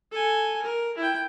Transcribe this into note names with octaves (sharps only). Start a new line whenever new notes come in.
A4 G#5
A#4
E4 G5